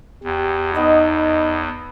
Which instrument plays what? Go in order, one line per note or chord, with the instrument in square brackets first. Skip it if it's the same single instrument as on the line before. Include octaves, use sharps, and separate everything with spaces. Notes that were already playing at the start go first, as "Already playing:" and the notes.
[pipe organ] E2 [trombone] G4
[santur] B3 D#5 B5 [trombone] D#4